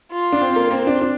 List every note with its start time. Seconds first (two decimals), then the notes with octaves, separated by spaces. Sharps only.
0.12 F4
0.33 D4
0.41 C4
0.56 A#3
0.71 A#3 C4
0.87 D4
1.01 D4